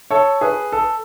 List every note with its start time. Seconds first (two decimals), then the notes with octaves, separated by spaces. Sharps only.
0.11 A4 C#5
0.41 G#4 B4
0.72 A4